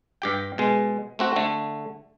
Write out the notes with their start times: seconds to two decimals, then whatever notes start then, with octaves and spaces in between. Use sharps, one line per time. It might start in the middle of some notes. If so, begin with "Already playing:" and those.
0.22 G2 G4 G5
0.58 B2 G#3
1.19 A3 C4 F#4
1.36 D3 A3